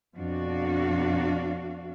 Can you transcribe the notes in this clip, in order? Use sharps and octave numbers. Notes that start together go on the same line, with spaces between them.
F2 B2 D4 F#4 F5